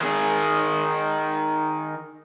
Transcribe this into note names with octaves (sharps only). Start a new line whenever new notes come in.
D#3 G#4